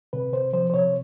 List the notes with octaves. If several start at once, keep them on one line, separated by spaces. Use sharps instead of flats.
C3 B4
C3 C5
F3 C5
C5
C3 C#5